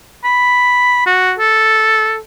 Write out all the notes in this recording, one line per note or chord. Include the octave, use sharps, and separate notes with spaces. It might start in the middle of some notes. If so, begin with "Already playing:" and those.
B5
F#4
A4